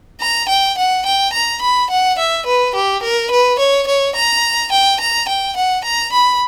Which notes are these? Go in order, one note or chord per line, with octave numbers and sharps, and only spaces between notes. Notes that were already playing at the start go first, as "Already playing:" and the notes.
A#5
G5
F#5
G5
A#5
B5
F#5
E5
B4
G4
A#4
B4
C#5
C#5
A#5
G5
A#5
G5
F#5
A#5
B5